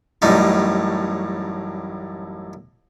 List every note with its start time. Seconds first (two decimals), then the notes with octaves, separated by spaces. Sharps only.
0.22 A1 F#2 A2 G3 D#4